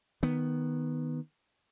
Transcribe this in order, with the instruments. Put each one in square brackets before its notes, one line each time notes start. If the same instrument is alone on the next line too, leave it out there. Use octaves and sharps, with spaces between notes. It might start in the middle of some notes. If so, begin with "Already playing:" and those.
[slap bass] D#3 B3